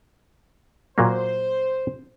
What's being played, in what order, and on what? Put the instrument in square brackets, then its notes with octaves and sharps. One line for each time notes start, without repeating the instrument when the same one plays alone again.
[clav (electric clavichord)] A#2 F#3 A#3 [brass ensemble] C5